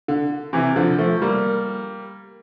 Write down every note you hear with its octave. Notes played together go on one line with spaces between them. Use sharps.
D3
C3 E3
D3 F3
F3 A3
G3 A#3